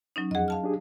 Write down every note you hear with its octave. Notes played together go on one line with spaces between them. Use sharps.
F#3 C#4 D#4
F2 G#4 D#5 F#5
F5 A5 F6
D4 G4 G#4